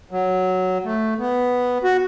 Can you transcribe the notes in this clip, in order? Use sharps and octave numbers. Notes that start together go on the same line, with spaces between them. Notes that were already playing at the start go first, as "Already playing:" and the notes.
F#3
A3
B3
F#4